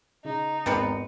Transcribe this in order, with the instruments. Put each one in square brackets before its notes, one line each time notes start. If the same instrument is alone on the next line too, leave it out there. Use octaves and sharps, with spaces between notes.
[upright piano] C#3 [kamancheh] D#4
[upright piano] G#1 E2 C#7 [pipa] F3 C4 B4